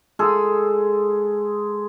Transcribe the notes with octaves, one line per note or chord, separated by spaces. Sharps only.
G#3 G#4 A4